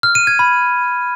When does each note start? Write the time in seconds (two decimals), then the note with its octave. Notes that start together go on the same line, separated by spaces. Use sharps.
0.03 F6
0.15 D#7
0.27 G#6
0.39 B5